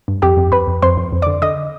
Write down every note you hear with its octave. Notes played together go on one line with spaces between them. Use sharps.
G2
F2 G4 G5
F2
F2 B4 B5
F2
F2 C5 C6
F2
F2
D3 D5 D6
D3 D#5 D#6